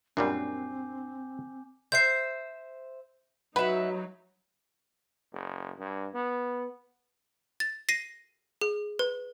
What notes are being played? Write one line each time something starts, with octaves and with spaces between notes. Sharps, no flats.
F#2 A#2 G3 C4 D4 G#5 D6 G6
C5 E5 G6 C7
F#3 D#4 B4 E5 F#5
F#1
G2
B3
A6
A#6 C7 D#7
G#4
B4